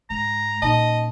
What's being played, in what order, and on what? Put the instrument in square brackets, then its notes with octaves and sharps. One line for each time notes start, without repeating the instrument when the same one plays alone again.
[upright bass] G#2 [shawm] A#5
[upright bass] A#2 C#3 [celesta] D#4 A5 [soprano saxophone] D#5